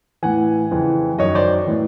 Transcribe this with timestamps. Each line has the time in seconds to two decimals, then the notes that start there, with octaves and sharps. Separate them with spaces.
0.23 A2 E3 F#5 G#5
0.71 F2 C#3 E3
1.19 F#2 D#3 C#5 D#5
1.35 C5 D5
1.67 A2 E3